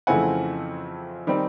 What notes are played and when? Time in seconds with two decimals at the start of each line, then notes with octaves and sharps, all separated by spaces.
0.07 F2 C#3 E3 A3 C4 F#5 G#5
1.27 D#3 G3 C4